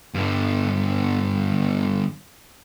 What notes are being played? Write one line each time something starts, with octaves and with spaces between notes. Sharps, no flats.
G2 D3